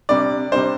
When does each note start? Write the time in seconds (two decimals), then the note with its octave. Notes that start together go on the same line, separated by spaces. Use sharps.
0.09 C3 G3 D4 D5
0.52 C3 G3 D4 C5